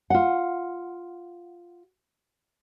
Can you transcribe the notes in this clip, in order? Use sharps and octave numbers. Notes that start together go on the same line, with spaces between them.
F4 F#5